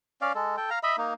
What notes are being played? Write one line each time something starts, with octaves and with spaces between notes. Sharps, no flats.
C#4 D5 F5
G#3 A4
A4 G5
F5 A#5
D#5 E5 B5
A#3 D#4